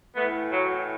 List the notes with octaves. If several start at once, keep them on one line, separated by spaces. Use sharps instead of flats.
A2 E3 A3 B3
F#3